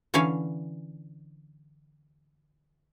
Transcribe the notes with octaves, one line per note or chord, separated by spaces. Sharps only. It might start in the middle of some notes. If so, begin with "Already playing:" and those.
D3 E3 C#4 C#5 F5 G#5